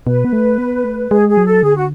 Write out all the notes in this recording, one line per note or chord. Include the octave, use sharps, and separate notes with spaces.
B2 B4
B3
A3
B3
A3
G#3 G#4
G#4
F#3
A4
D3 G#4
F#4